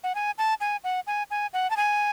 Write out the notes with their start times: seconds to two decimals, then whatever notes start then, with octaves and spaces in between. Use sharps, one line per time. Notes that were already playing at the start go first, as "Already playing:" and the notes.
0.04 F#5
0.15 G#5
0.38 A5
0.61 G#5
0.84 F#5
1.07 G#5
1.31 G#5
1.53 F#5
1.70 A5
1.77 G#5